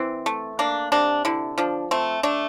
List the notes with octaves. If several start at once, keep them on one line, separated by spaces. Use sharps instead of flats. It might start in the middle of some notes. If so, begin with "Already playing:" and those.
Already playing: E3 C4
A3
A#3 D4
C3 D4
D3 E4
F3 D4
A3 C4
A3 D4